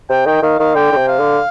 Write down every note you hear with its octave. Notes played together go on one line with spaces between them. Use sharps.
C3 G5
D#3 G5
D#3 F5
D#3 F5
D3 G5
D3
C3
F5
D3